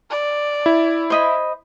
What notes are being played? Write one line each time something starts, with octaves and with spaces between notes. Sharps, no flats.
D5
E4
C5 D#5 B5